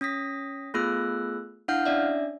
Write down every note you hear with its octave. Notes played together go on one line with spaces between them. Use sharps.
C#4 D#6 A#6 B6
A3 B3 F4 G#4 E6 F#6
D4 E4 F5 F#5 F6 G6
C#4 D4 D5 E5